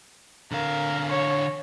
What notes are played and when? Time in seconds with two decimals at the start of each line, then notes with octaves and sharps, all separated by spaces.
0.52 D3 A#4 F5
1.09 C#5